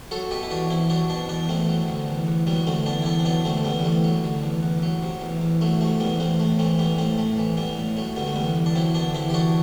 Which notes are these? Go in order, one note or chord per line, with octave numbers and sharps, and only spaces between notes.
F#3 F#4 A4
B2 G4 B4
E4
E2 D4 F#4
E2 C4 E4
F#3 D4 F#4
B2 B3 D4
E2 B3 D4
E2 A3 C4
F#3
D3
E2
E2
F#3 G3 B3
D3 A3 C4
E2 B3 D4
E4
E2 B3 D4
C4
F#3 B3 D4
D3 A3 C4
E2 G3 B3
G3
E2 A3
F#3
D3
E2
E2
F#3
C3
E2
E2
F#3 A3
C3 A3
E2 G3 B3
E2 A3 C4
A2 A3
E3 A3 C4
E3 G3 B3
A2 A3 C4
A2 A3
E3
E3 G3 B3
A2
F#3 A3
D3 G3 B3
A3
E2 G3 B3
E2
D4
F#3 C4 E4
D3 B3 D4
E2 C4 E4
G4
E2 D4 F#4